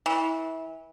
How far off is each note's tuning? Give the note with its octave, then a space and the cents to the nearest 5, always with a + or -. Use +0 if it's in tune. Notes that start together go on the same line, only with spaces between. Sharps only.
E3 -25